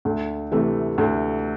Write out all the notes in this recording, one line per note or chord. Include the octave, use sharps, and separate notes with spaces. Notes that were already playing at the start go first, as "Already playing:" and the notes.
D2
C3 E3 A3
D2